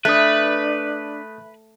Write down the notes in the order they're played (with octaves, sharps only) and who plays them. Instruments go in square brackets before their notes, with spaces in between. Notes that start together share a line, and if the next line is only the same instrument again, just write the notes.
[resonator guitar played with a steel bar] A3 [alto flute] D4 [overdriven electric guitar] B4 [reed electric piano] D#6 F#6